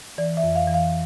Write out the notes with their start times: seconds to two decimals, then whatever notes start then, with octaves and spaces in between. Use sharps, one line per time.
0.18 E3 D5
0.37 E5
0.43 F2
0.56 F5
0.68 E3
0.74 F5